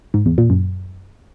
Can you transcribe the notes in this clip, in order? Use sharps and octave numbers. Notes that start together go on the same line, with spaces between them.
G#2
E2
A#2
F#2